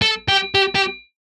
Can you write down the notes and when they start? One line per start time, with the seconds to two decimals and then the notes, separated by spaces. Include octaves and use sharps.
0.02 A4
0.28 G4
0.55 G4
0.75 G4